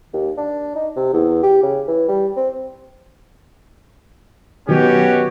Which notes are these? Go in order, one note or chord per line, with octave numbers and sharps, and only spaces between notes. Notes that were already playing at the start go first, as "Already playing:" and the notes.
D#2
D4
D#4
C3
E2
G4
C#3
E3
G3
C4
B2 D#3 F#3 C#4 F#4 G4